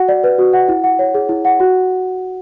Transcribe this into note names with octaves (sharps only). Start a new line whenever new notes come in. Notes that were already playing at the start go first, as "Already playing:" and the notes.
Already playing: F#4 F#5
D5
B4
F#4
F#5
E4
F#5
C#5
G#4
E4
F#5
F#4